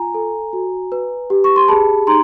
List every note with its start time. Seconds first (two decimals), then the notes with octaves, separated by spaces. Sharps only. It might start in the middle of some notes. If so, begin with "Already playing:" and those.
Already playing: F4 G#5 A#5
0.14 A4
0.53 F#4
0.92 B4
1.30 G4
1.44 C#6
1.56 C6
1.68 G#4 A5 B5
2.07 D#4 A#5 C6